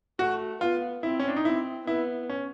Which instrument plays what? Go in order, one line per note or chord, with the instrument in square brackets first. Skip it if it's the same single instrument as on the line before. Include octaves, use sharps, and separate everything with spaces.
[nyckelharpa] A3 [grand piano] F#4
[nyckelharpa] B3 [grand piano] F4
[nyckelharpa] C4 [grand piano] E4
[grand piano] C#4
D4
D#4
[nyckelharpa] C4 [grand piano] E4
[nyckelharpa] B3 [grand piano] E4
[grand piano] C#4